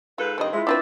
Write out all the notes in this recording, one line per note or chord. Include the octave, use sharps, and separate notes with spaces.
G#2 F4 A4 B4
G2 D#3 F3 C4 D#5
G#3 E4 F4 E5
C4 D4 F4 B4 D6 E6 A6